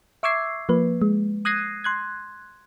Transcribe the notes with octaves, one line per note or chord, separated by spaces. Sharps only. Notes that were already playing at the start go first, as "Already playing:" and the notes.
E5 C#6 D6 E6 G#6 C7
F3 A#3 B4
G#3
D#6 F#6 G#6 A#6 C7 D#7
C6 F#6 G#6